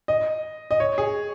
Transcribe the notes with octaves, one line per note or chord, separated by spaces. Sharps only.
D#5
D#5
C#5
G#4